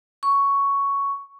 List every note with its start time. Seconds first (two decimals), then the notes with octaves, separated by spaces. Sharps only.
0.23 C#6